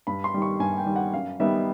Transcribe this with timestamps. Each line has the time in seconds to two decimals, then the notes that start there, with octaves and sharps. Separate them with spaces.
0.07 G2 B5
0.24 C6
0.34 D#3 G3
0.42 C#6
0.60 G2 G#5
0.78 G5
0.86 D#3 G3
0.96 F#5
1.13 F#2 F5
1.39 D#3 G3 B3 D#4 E5